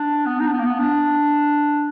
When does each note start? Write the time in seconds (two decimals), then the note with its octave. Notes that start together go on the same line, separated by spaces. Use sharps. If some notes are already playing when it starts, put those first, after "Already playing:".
Already playing: D4
0.26 B3
0.40 D#4
0.47 D4
0.53 B3
0.59 A#3
0.65 B3
0.79 D4